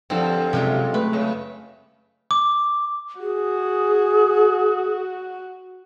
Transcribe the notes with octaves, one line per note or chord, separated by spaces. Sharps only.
G2 D3 F3 C4
F#2 C3 G#3 F4
A3 B4
C#3
D6
F#4 G#4